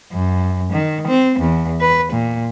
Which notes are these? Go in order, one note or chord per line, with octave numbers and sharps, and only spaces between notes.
F#2
D#3
C4
E2
B4
A#2